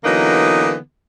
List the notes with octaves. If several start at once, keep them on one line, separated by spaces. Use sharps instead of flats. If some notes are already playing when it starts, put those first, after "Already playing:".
D3 E3 F#3 A#3 B3 D#4